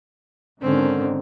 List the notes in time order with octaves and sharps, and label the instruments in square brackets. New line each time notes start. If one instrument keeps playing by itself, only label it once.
[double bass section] G#2 D3 D#3 [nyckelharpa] C4 C#4